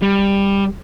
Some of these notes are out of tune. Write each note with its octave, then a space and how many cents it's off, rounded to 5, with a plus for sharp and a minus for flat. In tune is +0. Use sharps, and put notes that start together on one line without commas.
G3 +15